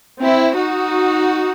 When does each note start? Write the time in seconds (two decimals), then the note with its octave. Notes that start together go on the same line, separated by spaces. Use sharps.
0.21 C4 E4
0.54 D#4 F#4